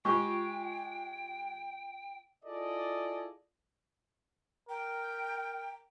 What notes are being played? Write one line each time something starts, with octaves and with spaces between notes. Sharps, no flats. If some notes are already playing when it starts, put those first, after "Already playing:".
G#3 F4 G4 G5 C#6
E4 F4 G#4 A4 D5 D#5
A#4 G5